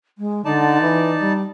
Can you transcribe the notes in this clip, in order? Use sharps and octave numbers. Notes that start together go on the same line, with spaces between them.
G#3
D3 D#4 D5 A5
E3
G3